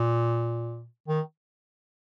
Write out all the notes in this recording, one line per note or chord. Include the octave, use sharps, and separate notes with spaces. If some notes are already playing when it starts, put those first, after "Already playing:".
Already playing: A#2
D#3